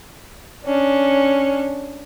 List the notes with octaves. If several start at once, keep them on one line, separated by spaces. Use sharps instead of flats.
C#4 D4